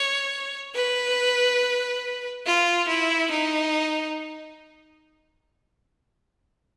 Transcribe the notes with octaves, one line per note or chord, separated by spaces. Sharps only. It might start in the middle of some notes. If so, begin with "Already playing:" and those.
Already playing: C#5
B4
F4
E4
D#4